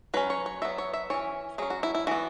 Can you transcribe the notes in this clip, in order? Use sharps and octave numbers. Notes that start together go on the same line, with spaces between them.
F#3 C#4 B4
C#5
C#5
F#3 B3 E5
C#5
E5
E3 C#4 C#5
F#3 C#4 G#4
F#4
E4
E4
E3 B3 F#4